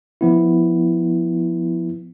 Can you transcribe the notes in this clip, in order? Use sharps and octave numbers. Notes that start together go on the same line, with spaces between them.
F3 B3 E4